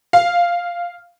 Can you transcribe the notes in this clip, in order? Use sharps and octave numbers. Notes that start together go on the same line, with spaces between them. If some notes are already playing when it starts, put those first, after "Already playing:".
F5